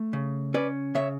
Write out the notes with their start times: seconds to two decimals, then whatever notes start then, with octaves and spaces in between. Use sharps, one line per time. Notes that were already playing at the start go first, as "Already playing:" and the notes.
Already playing: A3
0.13 C#3
0.54 C#4 B4 D5
0.95 C#3 C#5 E5